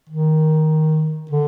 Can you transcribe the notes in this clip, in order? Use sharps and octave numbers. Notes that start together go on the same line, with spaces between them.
D#3
D3